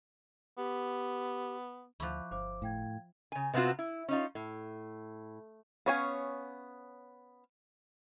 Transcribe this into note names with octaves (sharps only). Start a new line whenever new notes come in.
B3 G4
D2 F3 E4 C#6 D6 F#6
G1 C5 F5 D6
A2 F5 G5 G#6
C#3 G#5
C3 B3 C4 F4 F#4
E4
C#4 D#4 F4
A2
B3 C#4 C#5 F5 G#5